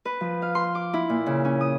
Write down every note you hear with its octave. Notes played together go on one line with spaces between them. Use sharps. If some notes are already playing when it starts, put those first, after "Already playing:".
B4
F3
F5
C6
D6
E4
A#2
C#3
C#4
D#6